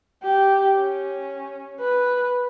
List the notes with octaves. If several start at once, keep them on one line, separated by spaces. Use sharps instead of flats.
G4
C#4
B4